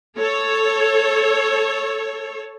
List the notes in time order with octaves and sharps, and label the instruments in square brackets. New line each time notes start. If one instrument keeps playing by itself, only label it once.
[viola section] A4 C#5